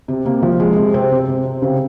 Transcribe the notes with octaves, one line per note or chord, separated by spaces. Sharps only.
C3
C3 A#3
F3
G#3
C3
C3 C4
C3
C3
C3
C#3 C4